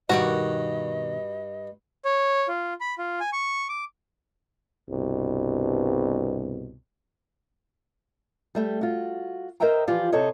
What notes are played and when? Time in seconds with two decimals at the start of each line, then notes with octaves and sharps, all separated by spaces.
0.10 G2 B2 D#3 F#4 D5 D#5
2.05 C#5
2.48 F4
2.81 B5
2.98 F4
3.20 G#5
3.33 C#6
3.69 D6
4.90 C2 G2 B2
8.55 G3 A3 G4
8.81 F4 F#4
9.60 A#4 C5 D#5 E5 G5 A#5
9.87 E3 F3 F4 G4 D5
10.12 C3 A4 C5 C#5 D#5